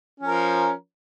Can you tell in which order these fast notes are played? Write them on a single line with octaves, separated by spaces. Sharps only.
C#4 F3 A#4